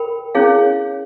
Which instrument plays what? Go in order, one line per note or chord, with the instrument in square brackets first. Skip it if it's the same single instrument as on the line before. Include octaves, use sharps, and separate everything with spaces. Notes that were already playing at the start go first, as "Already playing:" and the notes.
Already playing: [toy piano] A#4 G5 B5
C#4 E4 G#4 C#5 F5